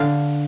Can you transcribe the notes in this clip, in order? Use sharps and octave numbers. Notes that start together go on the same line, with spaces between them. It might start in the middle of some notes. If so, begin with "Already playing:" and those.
Already playing: D3 F5